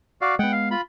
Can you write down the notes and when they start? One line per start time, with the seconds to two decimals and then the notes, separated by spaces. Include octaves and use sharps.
0.21 F#4 D5 F5
0.39 G#3 B3 F#5 G5
0.52 F5
0.71 F4 B5